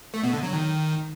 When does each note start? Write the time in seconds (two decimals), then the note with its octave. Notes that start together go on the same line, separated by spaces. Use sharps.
0.14 A3
0.23 B2
0.33 D3
0.43 F#3
0.53 D#3